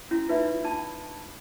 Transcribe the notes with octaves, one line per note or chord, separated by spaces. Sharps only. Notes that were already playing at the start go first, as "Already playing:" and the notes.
C#4 E4 F#4
D#4 F4 B4 D5 E5 B5
D4 A5 B5